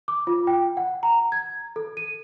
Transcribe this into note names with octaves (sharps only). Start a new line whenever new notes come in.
D6
F4
G5
F#5
A#5
G#6
A4
D#7